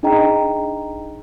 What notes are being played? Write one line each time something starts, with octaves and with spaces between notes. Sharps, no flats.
D4 D#4 G#4 D#5 G5 A#5